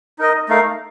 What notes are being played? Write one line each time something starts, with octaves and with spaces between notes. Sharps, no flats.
D#4 A#4 D#5
A3 D#4 A#4 F5